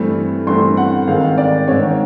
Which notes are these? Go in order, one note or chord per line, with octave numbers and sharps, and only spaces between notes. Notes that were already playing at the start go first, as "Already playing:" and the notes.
Already playing: G2 E3 A3 C4
G2 E3 A3 C4 C6
F#5
G#2 D#3 G#3 C4 F5
D5
G#2 D#3 G#3 C4 C#5